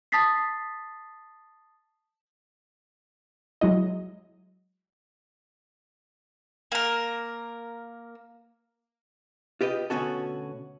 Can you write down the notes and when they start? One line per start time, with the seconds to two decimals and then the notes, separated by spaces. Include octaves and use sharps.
0.12 A5 D#6 A6 B6 C7
3.61 F#3 G#3 E4 D#5
6.72 A#3 A#4
9.61 F4 G4 B4 D#5
9.90 D2 B2 C#4 F#4 A4